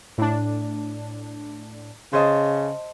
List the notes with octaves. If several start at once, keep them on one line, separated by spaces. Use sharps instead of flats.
A2 D4
C#3 C5 D#5 A5